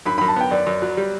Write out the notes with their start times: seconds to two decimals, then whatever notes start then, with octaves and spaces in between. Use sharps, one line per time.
0.06 F#2 B5
0.18 F#2 B5
0.28 A5
0.36 B3 G5
0.51 F#2 D5
0.67 F#2
0.82 F#3
0.97 G3